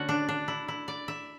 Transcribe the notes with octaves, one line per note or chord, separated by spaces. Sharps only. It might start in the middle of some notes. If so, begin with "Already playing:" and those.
Already playing: D3 A3 C#4 F#4
D4
D4
E4
E4
D5
E5